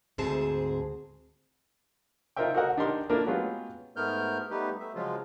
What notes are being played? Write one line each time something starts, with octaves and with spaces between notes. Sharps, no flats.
D2 G#2 C4 G#4 A5
D#4 F4 A#4 C5 E5 G5
F#4 A4 A#4 D#5 F#5
D4 D#4 G4 A#4 C6
A3 A#3 D4 E4 F4 A#4
F#3 G#3 B3 C#4 F4 G4
G#2 A3 B3 A#4 F6 G6
G3 A3 B3 D#4 G4 B4
A3 E5
C#3 F3 F#3 G#3 F4